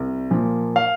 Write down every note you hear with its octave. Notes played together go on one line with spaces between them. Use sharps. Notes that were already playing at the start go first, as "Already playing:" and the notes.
Already playing: C2
A#2 F3 A#3
F5